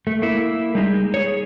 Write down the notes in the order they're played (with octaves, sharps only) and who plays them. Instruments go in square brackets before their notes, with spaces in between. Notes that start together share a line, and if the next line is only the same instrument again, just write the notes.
[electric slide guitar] A3
A#3 E4
G3 G#3 D#4
G#4 C#5